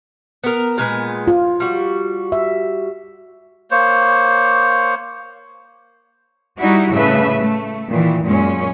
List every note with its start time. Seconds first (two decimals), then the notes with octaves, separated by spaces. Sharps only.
0.44 B3 A#4
0.78 A#2 G#3 B3
1.27 F4
1.60 G3 F#4
2.32 E5
3.71 A#3 C5 C#5
6.60 G3 D#4 E4 F#4
6.93 A2 C#3 A3 B4 E5
7.39 A3
7.90 A#2 D#3 E3
8.24 F#2 A#2 G#3 C#4